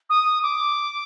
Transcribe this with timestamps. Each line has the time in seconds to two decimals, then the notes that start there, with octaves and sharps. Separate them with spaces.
0.09 D#6
0.42 D6